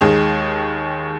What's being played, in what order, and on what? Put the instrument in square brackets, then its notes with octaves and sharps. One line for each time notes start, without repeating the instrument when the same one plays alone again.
[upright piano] D#2 D#3 G#3 D#4 G#4